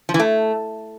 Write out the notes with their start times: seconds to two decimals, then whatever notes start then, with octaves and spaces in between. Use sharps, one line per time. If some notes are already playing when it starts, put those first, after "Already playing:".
0.09 F3
0.14 E3
0.19 A3